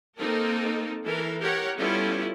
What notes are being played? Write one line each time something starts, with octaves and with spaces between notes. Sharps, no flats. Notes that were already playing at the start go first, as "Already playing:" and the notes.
A#3 C4 D#4 A4 A#4
E3 A4 A#4
G4 A#4 C#5 F#5
G3 B3 C#4 E4 F4 A4